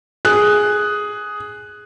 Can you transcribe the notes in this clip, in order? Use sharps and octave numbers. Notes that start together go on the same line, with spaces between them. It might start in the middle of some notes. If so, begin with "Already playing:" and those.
G#4 F#6